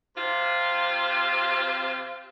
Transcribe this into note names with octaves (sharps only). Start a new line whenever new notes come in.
C3 C4 F4